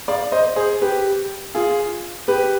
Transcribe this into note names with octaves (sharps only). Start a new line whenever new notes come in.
D5 F5
C5 D#5
G#4 C5
G4 B4
F4 G#4
G4 B4